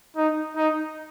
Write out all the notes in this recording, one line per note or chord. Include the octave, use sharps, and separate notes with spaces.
D#4
D#4